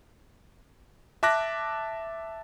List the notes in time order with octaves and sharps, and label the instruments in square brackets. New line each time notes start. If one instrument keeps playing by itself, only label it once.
[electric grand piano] E5 A5 D6 F#6 A#6